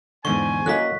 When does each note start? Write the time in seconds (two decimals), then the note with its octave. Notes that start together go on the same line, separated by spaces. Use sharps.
0.25 E2 G#2 D3 F3 C5 G#5 C#6
0.66 F#2 F#3 A#3 A4 D#5 F#6 B6